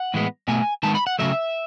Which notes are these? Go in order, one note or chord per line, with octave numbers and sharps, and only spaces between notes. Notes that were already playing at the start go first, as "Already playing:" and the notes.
Already playing: F#5
A2 E3 G#3 B3
B2 A3 G#5
D#3 G#3 B3 A5
B5
F#5
C#3 F#3 A3 E5